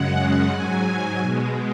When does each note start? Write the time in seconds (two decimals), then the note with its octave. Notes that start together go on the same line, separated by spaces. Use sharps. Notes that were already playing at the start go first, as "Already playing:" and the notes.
Already playing: F#2 C#3 G#3 F#5
0.50 G#2 F#3 G#5
1.20 B2 G#3